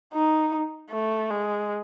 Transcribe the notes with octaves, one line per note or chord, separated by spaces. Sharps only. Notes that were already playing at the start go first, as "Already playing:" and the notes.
D#4
A3
G#3